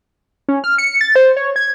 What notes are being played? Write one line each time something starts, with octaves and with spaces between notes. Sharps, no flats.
C#4
F6
C#7
A6
C5
C#5
G#6